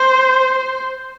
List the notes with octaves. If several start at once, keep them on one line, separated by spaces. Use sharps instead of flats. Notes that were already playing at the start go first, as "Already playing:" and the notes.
Already playing: C5